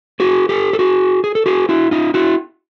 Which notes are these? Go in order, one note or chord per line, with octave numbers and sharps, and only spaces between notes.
F#4 G#4
G4 A4
A4
F#4 G#4
G#4
A4
F#4 G#4
E4 F#4
D#4 F4
E4 F#4